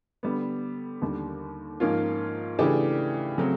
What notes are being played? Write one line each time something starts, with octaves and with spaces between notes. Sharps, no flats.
D3 G3 B3
D#2 D3 G3
G#2 F3 A#3 C#4 F4
C#3 E3 A3 D4 G4
C#3 F#3 A3 C4